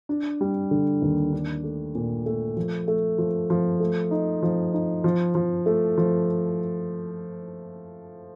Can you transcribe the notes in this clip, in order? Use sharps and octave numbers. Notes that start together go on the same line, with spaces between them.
D4
G3
D3
D#2
D4
A3
A#2
A3
F3
A3
F3
F3
A3
D#4
F3
D#4
F3
F3
A3
F3